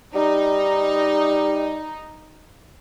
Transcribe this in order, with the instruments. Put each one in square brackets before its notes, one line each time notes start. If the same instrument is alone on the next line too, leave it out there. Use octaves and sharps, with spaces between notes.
[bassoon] G3 [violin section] D#4